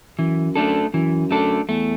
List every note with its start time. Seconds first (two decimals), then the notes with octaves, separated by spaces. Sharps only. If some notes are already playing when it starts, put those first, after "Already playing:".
0.18 F#2 E3
0.56 A3 D4 A4
0.93 F#2 E3
1.31 A3 D4 A4
1.69 E2 A3